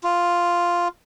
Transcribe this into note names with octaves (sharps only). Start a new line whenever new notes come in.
F4